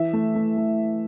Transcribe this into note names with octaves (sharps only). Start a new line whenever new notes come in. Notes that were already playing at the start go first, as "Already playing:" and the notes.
Already playing: E3 E5
A3
A3
A3